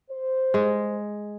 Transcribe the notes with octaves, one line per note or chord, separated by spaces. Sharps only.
C5
G#3